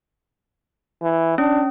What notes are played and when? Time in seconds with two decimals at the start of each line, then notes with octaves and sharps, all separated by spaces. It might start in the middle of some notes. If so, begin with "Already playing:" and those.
1.02 E3
1.38 C#4 D4